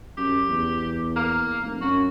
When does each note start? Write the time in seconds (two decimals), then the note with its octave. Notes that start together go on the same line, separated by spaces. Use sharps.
0.17 F#2 G4
0.49 E2
1.16 A#3
1.62 F1
1.81 F#2 F#4